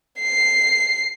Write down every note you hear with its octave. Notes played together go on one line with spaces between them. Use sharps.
C7